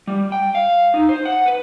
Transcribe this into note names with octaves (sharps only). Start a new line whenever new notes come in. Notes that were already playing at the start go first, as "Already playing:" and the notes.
G3
G5
F5
D#4
C5
F#5
B4